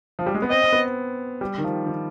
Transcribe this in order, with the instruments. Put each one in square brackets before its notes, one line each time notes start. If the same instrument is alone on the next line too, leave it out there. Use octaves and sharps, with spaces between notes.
[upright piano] F3
G3
G#3
B3
[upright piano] C4 [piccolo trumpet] D#5
[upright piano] C4
B3
G3
D#3
F3
D#3